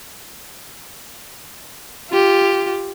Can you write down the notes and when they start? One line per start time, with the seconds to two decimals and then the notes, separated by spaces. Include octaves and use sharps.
2.10 F4 G4